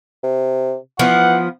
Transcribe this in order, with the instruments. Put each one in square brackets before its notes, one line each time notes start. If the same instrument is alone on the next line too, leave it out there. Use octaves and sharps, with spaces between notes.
[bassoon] C3
[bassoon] E3 [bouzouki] F3 B3 [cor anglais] F#5